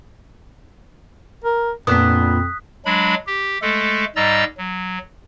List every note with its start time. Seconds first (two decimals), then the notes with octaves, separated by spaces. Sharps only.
1.44 A#4
1.87 F2 A#2 B3 D4 D#6 F#6 B6
2.85 F#3 G#3 D4 B5
3.27 G4
3.62 G#3 A3 A4
4.16 G#2 G3 D#5 A#5 E6 A6
4.57 F#3